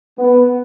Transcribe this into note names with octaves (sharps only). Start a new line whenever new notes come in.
B3